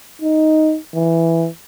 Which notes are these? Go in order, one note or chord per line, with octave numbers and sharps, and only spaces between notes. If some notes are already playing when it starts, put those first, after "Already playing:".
D#4
E3